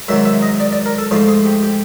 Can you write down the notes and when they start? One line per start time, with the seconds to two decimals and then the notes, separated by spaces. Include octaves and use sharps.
0.08 G#2 D#3 F#3 E5
0.25 E5
0.42 D#5
0.60 D5
0.73 D5
0.86 A#4
0.98 A4
1.11 G#2 F3 A3 G#4
1.28 G#4
1.45 G4
1.63 G4